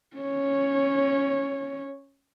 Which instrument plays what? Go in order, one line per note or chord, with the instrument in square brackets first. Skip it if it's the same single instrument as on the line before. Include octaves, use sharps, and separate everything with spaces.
[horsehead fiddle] C#4 C#5